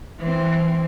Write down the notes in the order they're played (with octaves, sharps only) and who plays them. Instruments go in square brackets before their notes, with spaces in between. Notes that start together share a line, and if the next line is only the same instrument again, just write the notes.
[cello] E3 C4